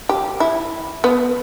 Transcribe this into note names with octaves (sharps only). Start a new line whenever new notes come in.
G4
E4
B3